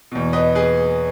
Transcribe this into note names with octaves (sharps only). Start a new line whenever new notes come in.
E2 B2
B4 D#5
G#4 B4